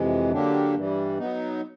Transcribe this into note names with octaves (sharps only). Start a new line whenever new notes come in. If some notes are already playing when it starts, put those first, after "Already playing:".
Already playing: F2 C3 E3 G#3
D3 F#3 A#3 D4 G4
G2 E3 G3
F#3 B3 D#4